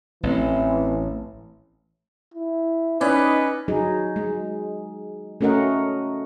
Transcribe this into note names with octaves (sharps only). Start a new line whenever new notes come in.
A1 E3 C4
E4
C#4 D#4 B4 D5 D#5
F#3 D#4 G#4
G#3
A3 C#4 F#4 A#4 D#5 F#5